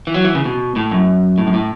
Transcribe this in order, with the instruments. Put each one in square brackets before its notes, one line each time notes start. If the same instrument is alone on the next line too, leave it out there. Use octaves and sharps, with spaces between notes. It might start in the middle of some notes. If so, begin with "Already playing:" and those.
[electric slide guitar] E3
F#3
E3
C#3
B2
A2
F#2
A2
F#2
A2